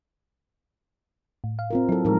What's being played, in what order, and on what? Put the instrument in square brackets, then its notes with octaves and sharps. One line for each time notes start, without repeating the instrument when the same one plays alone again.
[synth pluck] A2
F5
[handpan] C4 F4 A#4
[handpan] F#3 A4 [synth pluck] E4
[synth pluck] A2 F3 G#3 [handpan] D#4 A#4